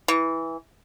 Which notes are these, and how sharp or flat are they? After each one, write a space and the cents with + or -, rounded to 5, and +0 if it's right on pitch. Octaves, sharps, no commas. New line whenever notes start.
E3 -10